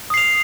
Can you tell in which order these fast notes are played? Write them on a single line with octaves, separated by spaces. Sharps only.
D#6 C7 F7